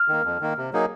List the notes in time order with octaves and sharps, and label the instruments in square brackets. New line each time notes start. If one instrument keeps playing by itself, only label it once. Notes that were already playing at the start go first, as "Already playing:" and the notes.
Already playing: [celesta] F6
[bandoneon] D#3 A#3
F2
D#3 A#3
C3
F#3 A#3 D#4 G#4